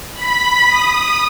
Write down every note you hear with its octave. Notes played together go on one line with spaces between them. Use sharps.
B5 B6
D#6